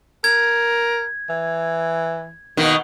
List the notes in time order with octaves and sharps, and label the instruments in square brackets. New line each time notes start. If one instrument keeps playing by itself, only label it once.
[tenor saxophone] A#4 [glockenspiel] G#6
[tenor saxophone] E3
[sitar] B2 D#3 [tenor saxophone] A#3